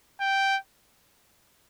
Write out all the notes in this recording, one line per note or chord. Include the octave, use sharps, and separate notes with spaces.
G5